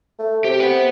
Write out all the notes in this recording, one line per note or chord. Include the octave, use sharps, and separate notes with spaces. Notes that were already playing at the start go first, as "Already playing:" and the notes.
A3
C3 G4
B4 F#5